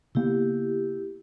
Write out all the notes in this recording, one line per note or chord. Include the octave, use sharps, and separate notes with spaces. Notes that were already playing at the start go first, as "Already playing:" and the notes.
C#3 A#3 B3 E4 G4